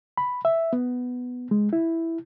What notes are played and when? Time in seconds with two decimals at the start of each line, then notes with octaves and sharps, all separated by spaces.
0.18 B5
0.45 E5
0.73 B3
1.51 G#3
1.73 E4